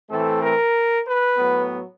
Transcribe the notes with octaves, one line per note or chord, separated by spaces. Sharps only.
A2 E3 A3 C4 A4
A#4
B4
A2 F#3 B3